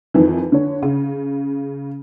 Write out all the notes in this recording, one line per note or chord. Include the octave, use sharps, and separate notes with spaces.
F2 D#3 E3
D3 C#5
C#3